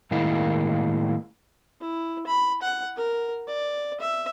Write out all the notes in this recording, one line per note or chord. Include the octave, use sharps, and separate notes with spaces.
A2 D#3 G#3 A#3 E4 F5
E4
B5
F#5
A#4
D5
E5